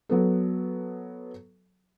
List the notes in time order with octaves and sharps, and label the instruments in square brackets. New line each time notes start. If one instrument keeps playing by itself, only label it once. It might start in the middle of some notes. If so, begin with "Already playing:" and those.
[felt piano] F#3 B3 A4